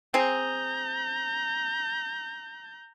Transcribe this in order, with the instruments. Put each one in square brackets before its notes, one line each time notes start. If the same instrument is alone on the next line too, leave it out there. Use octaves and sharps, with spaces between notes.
[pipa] C4 G#4 [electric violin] A#5 G6